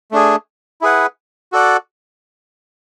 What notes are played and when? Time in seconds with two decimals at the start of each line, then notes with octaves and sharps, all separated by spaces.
0.11 A3 D4 G#4
0.81 E4 G#4 B4 F#5
1.52 F#4 A4 D5 F#5